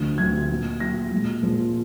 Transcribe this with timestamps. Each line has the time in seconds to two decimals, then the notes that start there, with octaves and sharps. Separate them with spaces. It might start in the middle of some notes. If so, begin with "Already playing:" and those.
Already playing: D2 D3 F3
0.18 D2 D3 F3 G#6
0.49 A#2 F#3
0.80 A#2 F#3 A#6
1.11 A#2 F3 G#3
1.42 A#2 F3 G#3